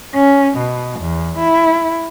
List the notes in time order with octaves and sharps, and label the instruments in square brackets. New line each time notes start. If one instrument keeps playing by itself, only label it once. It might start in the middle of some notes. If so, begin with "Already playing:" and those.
[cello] C#4
B2
E2
E4